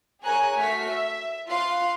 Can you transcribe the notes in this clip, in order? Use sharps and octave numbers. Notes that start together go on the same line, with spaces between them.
G#4 A#4 C#5 G#5 A#5 F#6
A3 F#4 F6 B6
E5
F4 F5 C6 F#6